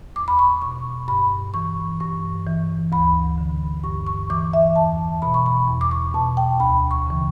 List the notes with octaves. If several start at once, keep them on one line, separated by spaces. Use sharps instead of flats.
E2 D6
B5
C#6
B2 C#6
G2 B5
E3 C#6
G2 C#6
E3
D2 B5
D3
G2 C#6
C#6
E3 D6
E5
E2 A5
B2 B5
C#6
B5
E2
D6
C#6
B2 A5
G5
D2 B5
C#6
C#3 E3